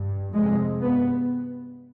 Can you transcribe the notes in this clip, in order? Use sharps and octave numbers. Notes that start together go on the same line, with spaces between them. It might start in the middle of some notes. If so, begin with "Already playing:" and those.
Already playing: G2
F2 C3 G#3
G2 B3